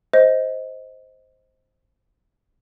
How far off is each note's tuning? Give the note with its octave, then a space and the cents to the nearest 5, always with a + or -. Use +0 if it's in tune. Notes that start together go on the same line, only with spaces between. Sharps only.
C5 +0 D#5 +15